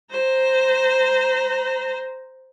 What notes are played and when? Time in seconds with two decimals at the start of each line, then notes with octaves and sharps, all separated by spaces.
0.12 C5 A#5